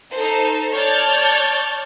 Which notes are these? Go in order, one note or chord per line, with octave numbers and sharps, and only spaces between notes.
D#4 A4 C5
C#5 D5 A5 F6 G6 A6